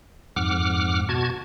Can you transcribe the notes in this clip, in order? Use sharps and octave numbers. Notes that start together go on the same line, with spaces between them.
F2 G#2 F#5 D6 F6
B2 F#4 A5 G#6